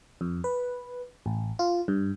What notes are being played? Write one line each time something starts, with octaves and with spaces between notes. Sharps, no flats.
F2
B4
A1
F4
G2